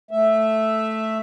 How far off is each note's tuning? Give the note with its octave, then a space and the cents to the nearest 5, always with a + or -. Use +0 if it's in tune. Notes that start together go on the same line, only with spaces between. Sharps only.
A3 +0 E5 +0